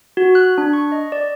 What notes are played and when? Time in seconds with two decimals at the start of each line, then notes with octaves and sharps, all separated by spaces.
0.17 F#4
0.35 F#6
0.58 D4
0.73 C#6
0.92 D#5
1.12 D5